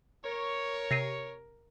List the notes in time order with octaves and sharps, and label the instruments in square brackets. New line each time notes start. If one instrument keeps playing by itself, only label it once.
[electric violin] A#4 [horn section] C#5
[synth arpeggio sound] C3 [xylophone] A#6 C7 D#7